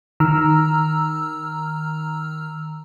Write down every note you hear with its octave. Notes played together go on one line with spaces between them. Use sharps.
D#3 A#5 E6 F6